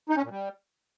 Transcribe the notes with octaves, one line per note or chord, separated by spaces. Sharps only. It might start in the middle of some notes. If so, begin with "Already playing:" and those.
D#4
C#4
A#2
G3